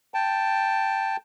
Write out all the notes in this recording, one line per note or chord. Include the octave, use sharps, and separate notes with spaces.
G5 A5